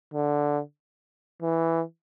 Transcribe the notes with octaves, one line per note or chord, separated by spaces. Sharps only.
D3
E3